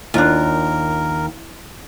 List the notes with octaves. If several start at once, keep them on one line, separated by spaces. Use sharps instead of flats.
D#2 D4 F4 A#4